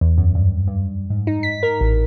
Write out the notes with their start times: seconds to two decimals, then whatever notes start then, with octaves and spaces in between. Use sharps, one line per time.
0.01 E2
0.18 F#2
0.35 G2
0.68 G2
1.10 G#2
1.27 D#4
1.43 B6
1.63 A#4
1.81 A1